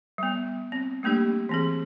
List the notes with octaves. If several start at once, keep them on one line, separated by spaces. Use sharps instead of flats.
G3 B3
C4
G3 A3 A#3 D4 G4
E3 C4 G#4